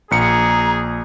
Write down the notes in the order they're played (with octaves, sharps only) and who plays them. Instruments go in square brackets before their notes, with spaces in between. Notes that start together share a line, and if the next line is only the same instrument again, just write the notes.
[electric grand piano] A#1 C#7 [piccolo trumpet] G#4 [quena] A#5